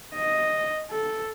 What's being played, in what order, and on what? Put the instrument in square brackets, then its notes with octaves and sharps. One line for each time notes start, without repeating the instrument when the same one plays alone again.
[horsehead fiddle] D#5
A4